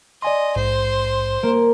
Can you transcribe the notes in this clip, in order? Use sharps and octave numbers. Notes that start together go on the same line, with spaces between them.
D5 D#5 G#5 C6
A#1 G#2 C5
A#3